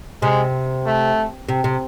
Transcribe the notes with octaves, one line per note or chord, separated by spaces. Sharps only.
C3 G#3
A3
C3
C3